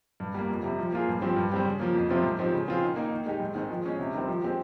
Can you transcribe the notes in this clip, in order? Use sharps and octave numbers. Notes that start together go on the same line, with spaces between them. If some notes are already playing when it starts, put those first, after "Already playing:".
G2
G3 A#3
F2
C3 G3
F3
A#3 F4 G#4
G2
F3 C4 G4
G2
G3 C4 G4
C#3
F3 A#3
F2
C3 F3 C4 F4
G#2
F3 C4 D#4 G4
C#3
F3 C4 F4 G#4
D#3
A#3 D#4
D#3
G#3 D#4 G4
G#2
D#3 G#3 C4
F3
G#3 C#4 G#4
C3
D#3 G3 C4
F3
G#3 C4 G4